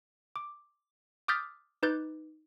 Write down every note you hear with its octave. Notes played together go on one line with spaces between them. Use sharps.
D6
D6 D#6 F6 G6 A6 B6
D#4 B4 D6 F#6 G6 A6